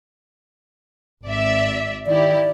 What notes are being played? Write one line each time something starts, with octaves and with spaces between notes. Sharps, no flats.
G#1 D5 E5
D#3 E4 G4 D5